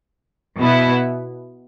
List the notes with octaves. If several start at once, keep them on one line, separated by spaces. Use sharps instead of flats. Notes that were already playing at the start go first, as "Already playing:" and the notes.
B2 B3 E4 B4